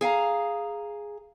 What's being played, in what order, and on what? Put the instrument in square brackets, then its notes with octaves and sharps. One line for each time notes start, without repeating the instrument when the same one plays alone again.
[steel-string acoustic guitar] G#4 F5 G5 A#5